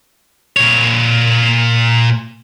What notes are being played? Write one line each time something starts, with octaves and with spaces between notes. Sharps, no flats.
A#2 C#5